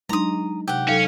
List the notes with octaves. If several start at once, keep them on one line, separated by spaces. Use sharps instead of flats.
F#3 G#3 D4 D#4 A#5 C6 D#6
C3 G4 F#5
F#3 C#4 D#4 A4 F5